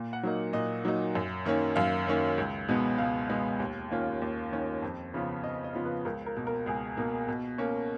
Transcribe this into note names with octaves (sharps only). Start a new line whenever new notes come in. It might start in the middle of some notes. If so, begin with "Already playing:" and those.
Already playing: A#2
F#5
F#3 A#3 D#4
A#2 D#5
F#3 A#3 D#4
F#2
D#3 A#3 C#4
F#2 F5
D#3 A#3 C#4
C#2
B2 G#3 B3
C#2 F5
B2 G#3 B3
D#2
D#3 A#3 C#4 F4
D#2
D#3 A#3 C#4 F4
F2
C#3 F3 B3 F4
F2 D#5
D#5
C#3 F3 B3 F4
B4
C#2 A#4
A#4
B2 A#3
A#4
C#2 G#4
B2 A#3
B2
A#3 C#4